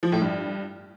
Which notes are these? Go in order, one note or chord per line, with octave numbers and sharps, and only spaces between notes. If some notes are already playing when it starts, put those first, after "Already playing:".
F3
A2
G2